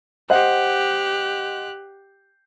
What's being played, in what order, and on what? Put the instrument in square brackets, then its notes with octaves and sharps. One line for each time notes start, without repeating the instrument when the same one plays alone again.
[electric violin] G4 F#6 [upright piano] C5 D#5 F#5